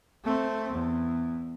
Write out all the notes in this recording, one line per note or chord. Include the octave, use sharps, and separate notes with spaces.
A3 C4
E2